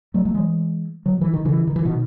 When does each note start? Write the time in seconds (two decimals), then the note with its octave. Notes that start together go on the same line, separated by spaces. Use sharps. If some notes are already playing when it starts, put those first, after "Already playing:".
0.14 F#3 A3
0.25 F#3 A3
0.34 E3 G#3
1.06 D#3 F#3
1.21 E3
1.34 D#3
1.45 C#3 E3
1.67 D#3
1.76 E3
1.85 B2 D#3